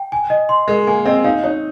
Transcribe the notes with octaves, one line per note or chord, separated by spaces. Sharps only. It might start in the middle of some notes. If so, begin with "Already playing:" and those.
Already playing: G5
G#5
D#5
C6
G#3 A#4
A#3 G#5
C4 D#5
D#4 F5
D#4 C#5